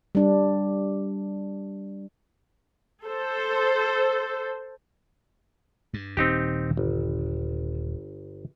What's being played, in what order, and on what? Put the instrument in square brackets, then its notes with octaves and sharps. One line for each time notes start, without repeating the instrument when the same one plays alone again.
[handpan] G3 D4
[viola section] A4 C5
[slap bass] G2
[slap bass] D#1 [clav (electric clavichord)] C4 D#4 G4
[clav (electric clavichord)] G1